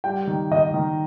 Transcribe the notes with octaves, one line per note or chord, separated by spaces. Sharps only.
G3 G5
D#3
D#3 D#5
D#3